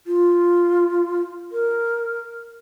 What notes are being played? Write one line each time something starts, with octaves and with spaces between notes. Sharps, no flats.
F4
A#4